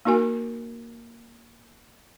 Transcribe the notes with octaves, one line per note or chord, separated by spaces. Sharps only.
A#3 D#4 F#4 A#4 G#5